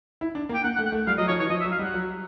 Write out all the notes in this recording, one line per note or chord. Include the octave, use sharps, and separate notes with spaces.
E4
D4
A#3
G5
A#3 F#5
F#5
A3
F#5
A3
G3 F5
F#3 D#5
F3 C#5
E3 C#5
F3 D#5
E5
F#3
F5
G3
F#5
F#3